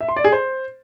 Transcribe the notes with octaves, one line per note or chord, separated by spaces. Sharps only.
E5
C6
D5
G#4
C5